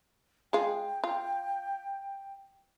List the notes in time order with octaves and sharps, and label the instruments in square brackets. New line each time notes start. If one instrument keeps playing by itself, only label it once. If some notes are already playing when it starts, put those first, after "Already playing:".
[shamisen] G#3 F4 [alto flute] G5
[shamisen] F4